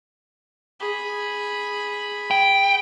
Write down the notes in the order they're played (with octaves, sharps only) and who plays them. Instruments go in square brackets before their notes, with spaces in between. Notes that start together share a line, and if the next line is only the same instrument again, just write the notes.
[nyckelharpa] G#4 B5
[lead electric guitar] G5